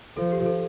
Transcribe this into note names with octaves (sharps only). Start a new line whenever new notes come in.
F3 A4
G4
A4